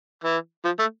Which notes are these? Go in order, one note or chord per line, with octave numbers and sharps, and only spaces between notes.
E3
F3
A3